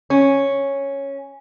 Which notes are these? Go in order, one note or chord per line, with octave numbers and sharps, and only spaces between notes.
C#4